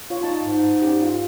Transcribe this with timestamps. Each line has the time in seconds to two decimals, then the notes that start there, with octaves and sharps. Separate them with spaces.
0.10 F4 C#5
0.23 D#4 A5
0.41 G#2
0.82 C#4 G4
1.02 F4